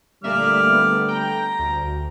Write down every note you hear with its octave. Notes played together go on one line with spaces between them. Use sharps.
A#2 D3 G3 A3 A#3 D5 E5 F6
B3
G5 A#5
D2